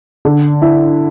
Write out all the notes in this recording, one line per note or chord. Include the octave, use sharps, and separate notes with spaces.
D3
E4